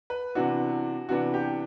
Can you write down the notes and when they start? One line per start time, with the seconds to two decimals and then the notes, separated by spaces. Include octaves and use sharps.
0.10 B4
0.35 C3 E3 B3 D4 F#4
1.09 C3 E3 B3 D4 F#4
1.34 G4